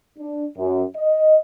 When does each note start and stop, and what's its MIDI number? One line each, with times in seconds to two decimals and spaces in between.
0.19 0.47 62
0.58 0.83 42
0.96 1.37 75